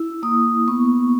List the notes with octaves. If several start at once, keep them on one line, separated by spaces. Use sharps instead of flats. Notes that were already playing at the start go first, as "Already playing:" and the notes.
Already playing: E4 E6
A#3 D#6
B3 C#6